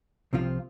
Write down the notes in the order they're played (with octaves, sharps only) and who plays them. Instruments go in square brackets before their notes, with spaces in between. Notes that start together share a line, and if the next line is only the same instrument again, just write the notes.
[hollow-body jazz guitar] C2 C3 F3 C4 F4